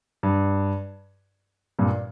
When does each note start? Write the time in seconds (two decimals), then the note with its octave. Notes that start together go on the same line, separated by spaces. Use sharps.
0.23 G2
1.79 G2 A#2